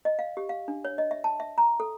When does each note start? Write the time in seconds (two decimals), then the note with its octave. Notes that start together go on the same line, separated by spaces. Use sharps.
0.05 D#5
0.19 F5
0.37 G4
0.49 F5
0.68 D4
0.85 C#5
0.98 D#5
1.11 E5
1.24 A5
1.40 E5
1.58 A#5
1.80 A4